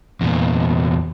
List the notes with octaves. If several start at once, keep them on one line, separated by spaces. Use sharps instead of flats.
E2 A#2